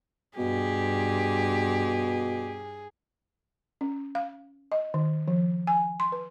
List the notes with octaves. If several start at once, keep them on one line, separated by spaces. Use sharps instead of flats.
G2 B2 G4 G#4
C#4
F5
D#5
D#3
F3
G#5
C6
B4